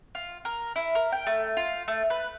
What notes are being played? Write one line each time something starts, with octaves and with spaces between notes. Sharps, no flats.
F4
A#4
E4
A#4
G5
A3
F4
A3
B4